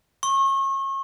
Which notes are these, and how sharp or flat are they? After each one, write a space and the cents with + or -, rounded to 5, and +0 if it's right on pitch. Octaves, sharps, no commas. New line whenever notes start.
C#6 -35